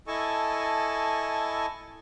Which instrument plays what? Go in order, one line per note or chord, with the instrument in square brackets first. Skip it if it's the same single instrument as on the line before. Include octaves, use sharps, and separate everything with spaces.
[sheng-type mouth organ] E4 A4 D#5 G#5 A5 C#6